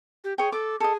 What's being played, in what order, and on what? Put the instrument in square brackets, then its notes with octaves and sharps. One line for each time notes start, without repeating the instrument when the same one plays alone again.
[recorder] G4
[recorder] G#4 [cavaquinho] C#5 G5
[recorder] A4 [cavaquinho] D6
[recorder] G#4 [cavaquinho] A4 D#5